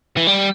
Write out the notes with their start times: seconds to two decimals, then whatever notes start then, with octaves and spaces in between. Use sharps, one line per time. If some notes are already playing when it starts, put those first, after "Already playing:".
0.17 E3
0.27 G3